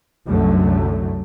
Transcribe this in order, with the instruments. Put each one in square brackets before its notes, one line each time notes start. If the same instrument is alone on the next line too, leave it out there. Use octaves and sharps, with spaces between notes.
[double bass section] C2 F#2 D3 F#3 A3